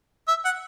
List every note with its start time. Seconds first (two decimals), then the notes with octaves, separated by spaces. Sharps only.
0.28 E5
0.45 F#5